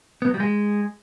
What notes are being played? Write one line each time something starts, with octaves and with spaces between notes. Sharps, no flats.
B3
F#3
G3
G#3